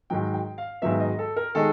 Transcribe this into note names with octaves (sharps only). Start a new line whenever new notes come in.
G#2 D#3 F#3 G5
G5
F5
G#2 D#3 F#3 B3 E5
D#5
A4
A#4
D#3 G#3 A4